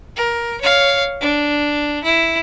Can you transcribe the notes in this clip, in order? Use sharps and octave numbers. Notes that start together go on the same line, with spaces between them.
A#4
C#5 F5
D4
E4